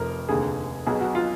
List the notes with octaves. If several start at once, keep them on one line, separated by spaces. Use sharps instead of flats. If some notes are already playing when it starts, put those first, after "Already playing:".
Already playing: F1 F2 F3 A#4
F1 D#2 D3 G#4
B1 B2 F#3 G#4
F#4
F4